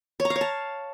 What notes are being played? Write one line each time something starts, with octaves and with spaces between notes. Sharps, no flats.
C#5
A#5
F5
C#5
A5